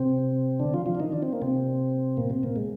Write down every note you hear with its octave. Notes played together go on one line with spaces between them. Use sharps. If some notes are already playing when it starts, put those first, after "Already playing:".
Already playing: C3 C4
D3 D4
F3 F4
F3 F4
D4
D#3 D#4
D4
C4
A#3
C3 C4
A#2 A#3
C3 C4
A#2 A#3
G#3